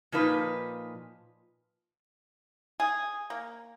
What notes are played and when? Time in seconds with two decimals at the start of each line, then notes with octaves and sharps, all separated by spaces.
0.12 A#2 F3 D#4 B4
2.80 G#4
3.30 A#3